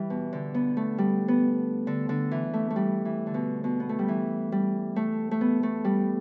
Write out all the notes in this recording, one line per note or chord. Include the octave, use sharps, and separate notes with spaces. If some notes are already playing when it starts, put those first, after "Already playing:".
Already playing: E3 G3
B2
D3
B3
A3
G3
B3
D3
D3
E3
A3
A3
G3
E3
D3
B2
B2
B3
A3
G3
E3
G3
A3
A3
B3
A3
G3